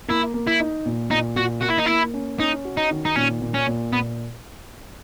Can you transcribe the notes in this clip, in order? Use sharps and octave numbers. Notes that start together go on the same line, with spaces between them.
A#3 E4
A#3
E4
D#4
A#2
A#2 D#4
A#2 F#4
A#3 F#4
E4
D#4
A#3 E4
C#4
C#4 D#4
F#4
D#4
D#3
D#4
A#2 C#4
A#2
C#4
A#2
A#2 B3